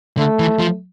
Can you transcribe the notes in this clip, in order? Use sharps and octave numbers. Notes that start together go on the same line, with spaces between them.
D3 A3
E3
F3